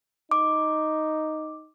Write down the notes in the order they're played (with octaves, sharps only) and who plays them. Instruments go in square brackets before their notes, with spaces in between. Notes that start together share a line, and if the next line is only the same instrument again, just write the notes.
[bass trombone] D#4 [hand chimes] D6